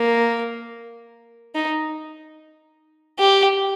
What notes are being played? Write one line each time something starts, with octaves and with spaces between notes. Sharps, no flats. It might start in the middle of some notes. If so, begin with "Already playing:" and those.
Already playing: A#3
D#4
G4